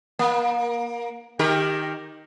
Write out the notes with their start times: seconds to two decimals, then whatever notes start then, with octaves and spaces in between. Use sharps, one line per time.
0.19 A#3
1.39 D#3 G4 A#4